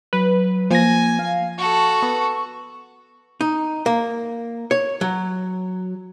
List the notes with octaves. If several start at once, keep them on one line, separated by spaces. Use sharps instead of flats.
F#3 B4
F3 A#3 G#5 A#6
F5
F#4 A4 C#6
B3
D#4
A#3
C#5
F#3